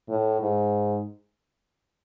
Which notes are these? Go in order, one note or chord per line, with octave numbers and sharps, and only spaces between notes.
A2
G#2